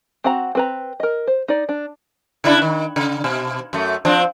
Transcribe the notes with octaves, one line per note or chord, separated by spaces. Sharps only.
C4 F#4 F#5 A#5
C4 B4 A#5
A#4 D#5
C5
D#4 D5
D4
C#3 D4 E4
D#3
C#3
B2
F#2 A3
F3 C4 D4